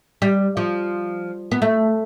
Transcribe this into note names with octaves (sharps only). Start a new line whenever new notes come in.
G3
F3
B3
A3